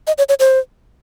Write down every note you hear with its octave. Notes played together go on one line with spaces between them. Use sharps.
D#5
C#5
C#5
C5